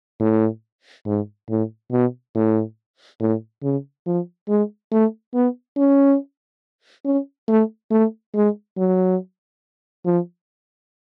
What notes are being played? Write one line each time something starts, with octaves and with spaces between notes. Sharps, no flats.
A2
G#2
A2
B2
A2
A2
C#3
F3
G#3
A3
B3
C#4
C#4
A3
A3
G#3
F#3
F3